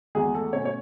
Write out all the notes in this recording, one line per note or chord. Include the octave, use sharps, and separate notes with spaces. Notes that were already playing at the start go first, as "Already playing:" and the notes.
E2 G#3 G#4
A3 A4
B2 A3 C#4 C#5
C#5